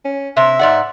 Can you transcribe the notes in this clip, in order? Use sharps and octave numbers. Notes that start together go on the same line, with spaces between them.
C#4
C3 E5
G#2 D5 F#5